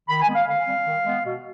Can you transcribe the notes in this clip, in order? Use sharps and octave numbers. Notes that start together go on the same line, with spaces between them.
D#3 B5
G#5
G#3 B3
F5
D3 F5
G3 C4
D#3
G#3 B3
B2